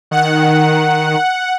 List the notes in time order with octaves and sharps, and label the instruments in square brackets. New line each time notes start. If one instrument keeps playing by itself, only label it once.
[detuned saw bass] D#3 [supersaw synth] F#5